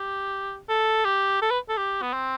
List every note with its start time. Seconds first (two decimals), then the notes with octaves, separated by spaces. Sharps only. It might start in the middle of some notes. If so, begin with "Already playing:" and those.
Already playing: G4
0.69 A4
1.05 G4
1.42 A4
1.51 B4
1.69 A4
1.77 G4
2.02 B3
2.13 C4